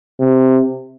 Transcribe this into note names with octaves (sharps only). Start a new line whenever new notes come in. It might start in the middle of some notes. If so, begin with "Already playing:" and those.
C3